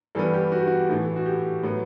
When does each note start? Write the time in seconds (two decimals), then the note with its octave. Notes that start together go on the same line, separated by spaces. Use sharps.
0.15 G2 E3 G3 B3 A4
0.34 G4
0.52 F#4
0.59 G4
0.67 F#4
0.89 A2 E3 A3
1.16 F#4
1.26 G4
1.63 A2 F#3 B3